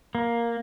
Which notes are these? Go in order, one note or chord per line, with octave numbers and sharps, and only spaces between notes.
A#3